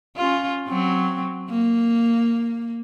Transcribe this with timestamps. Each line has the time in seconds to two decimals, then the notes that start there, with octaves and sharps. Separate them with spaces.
0.16 C#4 F4
0.68 F#3 C4
1.49 A#3